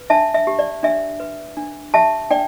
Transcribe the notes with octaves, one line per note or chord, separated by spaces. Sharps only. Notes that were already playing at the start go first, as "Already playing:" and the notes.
Already playing: B4
D4 E5 A5
E5
G4
D5
D4 E5
B4
D4
G4 E5 A5
D4 D5 G5